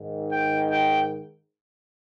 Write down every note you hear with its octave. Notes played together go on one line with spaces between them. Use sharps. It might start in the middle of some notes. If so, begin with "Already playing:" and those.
Already playing: G#2 D#3
G5
G5